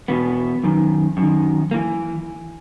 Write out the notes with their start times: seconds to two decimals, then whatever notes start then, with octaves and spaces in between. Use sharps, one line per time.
0.08 E2 B2 B3
0.63 F#2 D#3
1.17 F#2
1.22 D#3
1.71 A#3
1.74 E3